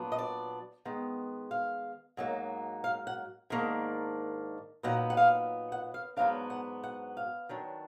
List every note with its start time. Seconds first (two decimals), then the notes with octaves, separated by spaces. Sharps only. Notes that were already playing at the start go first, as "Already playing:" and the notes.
Already playing: A#2 F#3 B3 D4
0.12 D#5
0.18 D5
0.85 D#3 G#3 B3
1.51 F5
2.17 G#2 F#3 A#3 D#4
2.84 F5
3.07 F#5
3.50 G#2 D#3 A#3 D4
4.83 A#2 F#3 B3 D#4 F#5
5.10 F#5
5.17 F5
5.72 F#5
5.94 F5
6.17 G#2 F#3 B3 D4 F5
6.50 F#5
6.84 F#5
7.17 F5
7.49 D#3 F#3 D4